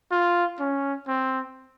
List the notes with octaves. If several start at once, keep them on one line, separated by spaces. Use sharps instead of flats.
F4
C#4
C4